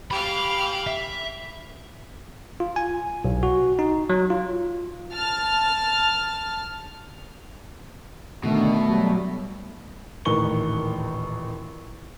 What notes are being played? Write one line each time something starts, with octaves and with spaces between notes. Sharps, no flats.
G4 F5 G#5 B5
E5
F4
G#5
B1
F#4
D#4
F#3
F4
A5 F6
B2 D3 D#3 A3
F#3 G3
D#1 A1 D#3 B4 C#6 G7